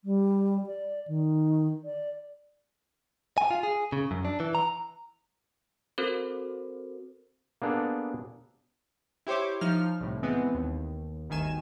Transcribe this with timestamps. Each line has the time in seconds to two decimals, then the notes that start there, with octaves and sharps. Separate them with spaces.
0.05 G3
0.66 D5
1.08 D#3
1.85 D5
3.38 G#5
3.51 F4
3.63 G#4
3.92 C#3
4.11 F#2
4.25 D4
4.40 E3
4.55 A#5
5.98 C4 F#4 A4 A#4 C5
7.62 A#3 B3 D4 G#4 A4
9.27 E4 G4 C5 C#5 D6
9.61 F3 D#4 F6
10.00 C2 A2
10.23 E3 G#3 B3 C4
10.54 D#2
11.29 G1 D2 D#3 G#5 E7